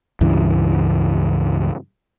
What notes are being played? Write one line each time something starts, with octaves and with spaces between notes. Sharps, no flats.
C#2 G2 E3